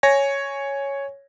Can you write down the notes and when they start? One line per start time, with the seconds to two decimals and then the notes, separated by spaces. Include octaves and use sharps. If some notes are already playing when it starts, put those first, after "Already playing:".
0.03 C#5 G#5 A#6